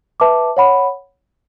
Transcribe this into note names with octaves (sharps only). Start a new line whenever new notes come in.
B4 E5 A5 D6
C#5 F#5 B5